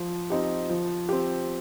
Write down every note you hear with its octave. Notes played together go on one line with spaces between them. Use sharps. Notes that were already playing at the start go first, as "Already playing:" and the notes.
Already playing: F3
C4 D#4 G4
F3
C4 G4